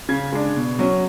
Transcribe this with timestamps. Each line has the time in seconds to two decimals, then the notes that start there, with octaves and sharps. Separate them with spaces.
0.09 C#3 G#6
0.33 G#3 D4
0.56 B2
0.79 F#3 C#4